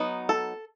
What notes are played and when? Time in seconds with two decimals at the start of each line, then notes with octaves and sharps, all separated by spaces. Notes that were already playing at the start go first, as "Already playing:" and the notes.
Already playing: F#3 B3 D#4
0.29 A4